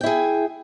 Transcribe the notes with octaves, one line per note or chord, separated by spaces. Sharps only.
E4 G#4 G5